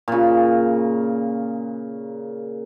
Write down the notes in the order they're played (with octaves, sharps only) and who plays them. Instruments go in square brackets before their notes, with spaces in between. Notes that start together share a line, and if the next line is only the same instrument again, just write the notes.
[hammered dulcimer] A#2 C#3